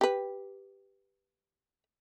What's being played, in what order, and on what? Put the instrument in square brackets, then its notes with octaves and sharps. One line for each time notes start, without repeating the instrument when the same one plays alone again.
[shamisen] G4 B4